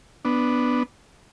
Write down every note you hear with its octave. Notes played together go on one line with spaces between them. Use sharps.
B3 D4